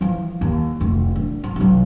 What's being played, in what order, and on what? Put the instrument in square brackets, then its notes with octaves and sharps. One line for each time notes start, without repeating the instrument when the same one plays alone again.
[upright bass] E3 F3
D#2
F1 D2
D3
F3
B1 F#3